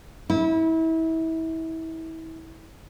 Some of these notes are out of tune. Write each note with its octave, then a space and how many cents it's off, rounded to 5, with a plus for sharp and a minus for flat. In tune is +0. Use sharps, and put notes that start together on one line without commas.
E4 -30